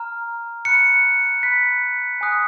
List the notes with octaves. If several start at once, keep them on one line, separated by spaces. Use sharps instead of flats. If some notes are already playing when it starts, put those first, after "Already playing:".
Already playing: A#5 F6
B5 F#6 C#7
B5 F#6 B6
G#5 D#6 F#6